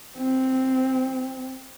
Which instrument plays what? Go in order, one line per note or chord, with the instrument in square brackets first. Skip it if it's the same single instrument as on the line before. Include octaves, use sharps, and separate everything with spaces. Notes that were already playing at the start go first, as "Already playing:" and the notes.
[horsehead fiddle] C4